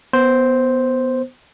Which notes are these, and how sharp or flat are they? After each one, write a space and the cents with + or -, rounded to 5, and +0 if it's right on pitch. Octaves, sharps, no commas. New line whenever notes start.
B3 +0 C5 +0